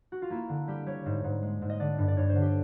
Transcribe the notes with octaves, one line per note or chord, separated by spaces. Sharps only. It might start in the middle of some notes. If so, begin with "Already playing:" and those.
F#4
F4
A#3 E4
D3
G3 G4
G3 C#5
G#2
G#2
G#3
G#2
D#5
D3 D5
G2
D5
G2 C#5
C5
D3
G4